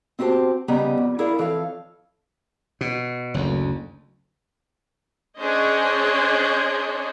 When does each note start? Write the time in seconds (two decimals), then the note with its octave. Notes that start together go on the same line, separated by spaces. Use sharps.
0.19 C4 E4 F#4 G4 C5 A5
0.68 C#3 G3 B3 D#5 G5 A#5
0.97 F2
1.19 E4 G#4 A#4 D5 F5
1.38 F2 E3 A4 C#5 F5
2.81 B2
3.34 F#1 D2
5.40 C#4 D4 G#4 C5 C#5 D#5